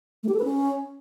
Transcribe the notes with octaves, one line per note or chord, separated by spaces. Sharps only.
A3
G4
A4
B4
C#4